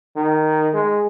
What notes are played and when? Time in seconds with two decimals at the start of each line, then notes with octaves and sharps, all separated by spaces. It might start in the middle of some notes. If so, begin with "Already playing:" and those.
0.16 D#3
0.74 G#3